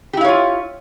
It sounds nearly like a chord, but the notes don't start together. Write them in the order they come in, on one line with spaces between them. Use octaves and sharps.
G4 E4 F5 C#5 F4